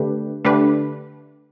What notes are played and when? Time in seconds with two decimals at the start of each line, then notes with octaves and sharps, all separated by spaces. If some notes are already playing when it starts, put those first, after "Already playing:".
Already playing: D3 A3 D4 G4 B4
0.45 D3 A3 D4 G4 B4